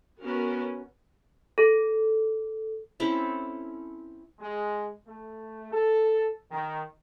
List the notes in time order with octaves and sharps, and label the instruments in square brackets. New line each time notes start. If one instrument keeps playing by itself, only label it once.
[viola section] B3 C#4 F#4 A#4
[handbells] A4
[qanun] C4 C#4 E4 A4
[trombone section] G#3
A3
A4
D#3